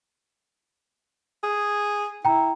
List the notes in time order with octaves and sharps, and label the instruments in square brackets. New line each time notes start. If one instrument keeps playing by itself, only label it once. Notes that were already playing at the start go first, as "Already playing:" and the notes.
[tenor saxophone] G#4
[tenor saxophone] E4 [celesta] G5 A#5